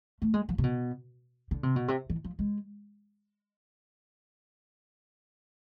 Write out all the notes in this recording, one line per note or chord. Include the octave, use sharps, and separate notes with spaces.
A3
G#3
F3
C3
B2
D3
C3
B2
C3
E3
F3
G#3